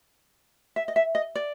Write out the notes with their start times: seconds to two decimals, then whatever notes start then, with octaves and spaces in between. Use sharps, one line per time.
0.76 E5
0.88 D#5
0.96 E5
1.15 D#5
1.35 D5